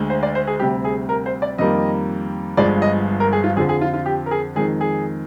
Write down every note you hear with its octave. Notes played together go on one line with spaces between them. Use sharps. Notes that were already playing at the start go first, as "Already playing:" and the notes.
Already playing: D2 D3 G#3
C5
D5
C5
G#4
D2 C3 G3 G4
G#4
A#4
C5
D5
F2 D#3 G3 A#3 D#5
G1 G2 F3 G#3 D5
D#5
A#4
G#4
F4
F2 D3 F3 G#4
G#4
F4
F4
G4
A#4
G#4
F2 D#3 G#3 G#4
G#4